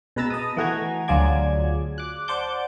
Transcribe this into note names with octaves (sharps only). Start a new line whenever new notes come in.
B2 G#3 B4 A#5 E6 A6
D#5 A5 D#6
E3 A3 F#4 G#5 A#5 G#6
D2 F#3 F4 G#4 D5 G#6
D6 F#6
C5 D5 F#5 A5 D6 G6